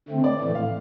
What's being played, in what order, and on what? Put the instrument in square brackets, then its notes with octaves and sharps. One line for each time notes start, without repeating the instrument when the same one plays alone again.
[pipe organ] D3 A3 C4
[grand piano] D5
[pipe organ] A2 E3 A3
[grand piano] F5